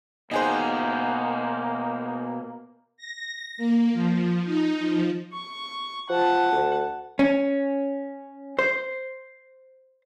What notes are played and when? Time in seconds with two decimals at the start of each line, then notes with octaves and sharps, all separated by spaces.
0.31 B2 A#3 D#4 G4 G#4 C5
2.97 A#6
3.57 A#3
3.93 F3
4.44 D#4
4.79 F3
5.33 C#6
6.09 F3 F#5 A5
6.52 D2
7.19 C#4
8.59 C5